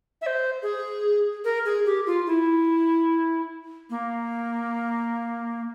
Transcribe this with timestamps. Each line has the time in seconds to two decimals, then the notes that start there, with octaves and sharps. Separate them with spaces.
0.22 E5
0.26 C5
0.63 G#4
1.45 A#4
1.65 G#4
1.86 G4
2.06 F4
2.27 E4
3.90 A#3